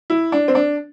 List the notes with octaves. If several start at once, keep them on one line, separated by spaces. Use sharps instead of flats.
E4
D4
C4
D4